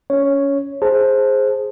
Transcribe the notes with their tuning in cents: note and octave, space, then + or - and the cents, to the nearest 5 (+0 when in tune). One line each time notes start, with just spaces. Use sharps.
C#4 +20 C#5 +0
G#4 +0 C5 +10 A5 +0